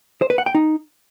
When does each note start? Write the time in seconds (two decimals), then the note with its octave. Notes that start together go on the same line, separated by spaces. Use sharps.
0.22 C5
0.30 B4
0.38 F#5
0.46 G5
0.55 D#4